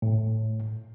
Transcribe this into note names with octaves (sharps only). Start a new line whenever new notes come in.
A2